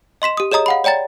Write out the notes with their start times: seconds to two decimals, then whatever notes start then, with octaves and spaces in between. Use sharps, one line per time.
0.22 D#5 C6 B6 E7
0.37 G4 D#6
0.51 G#4 C#5 D#5 A#5 D#6
0.66 F5 F#5 B5
0.84 C#5 D5 G5 A#5 A6